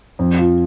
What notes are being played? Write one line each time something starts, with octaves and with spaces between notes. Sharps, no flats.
F2
F3